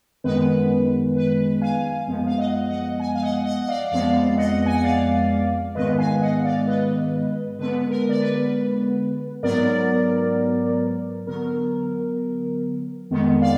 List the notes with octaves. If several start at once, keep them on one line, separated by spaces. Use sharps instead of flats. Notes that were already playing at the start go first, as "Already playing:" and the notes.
F#2 D#3 G#3 B3 B4
B4
F5 G#5
F#2 F3 G#3 B3
F5
D#5 F#5
D#5 F#5
G#5
F5 G#5
D#5 F#5
D#5 F#5
F#5
D5 F5
F2 F3 G#3 B3 D5 F5
D#5 F#5
G#5
F#5
D5 F5
G#2 D#3 G#3 B3 B4 D#5
F5 G#5
D#5 F#5
D5 F5
B4 D#5
D3 G#3 B3 B4
A#4
D5
B4
G#2 F#3 B3 A#4 D5
D3 F#3 B3 A#4
F2 D#3 G#3 B3
D5 F5